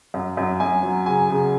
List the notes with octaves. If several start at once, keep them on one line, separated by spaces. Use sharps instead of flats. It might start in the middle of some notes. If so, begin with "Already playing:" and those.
F#2
F#2
F#2 G#5
F#3
C#3 G#5
C#3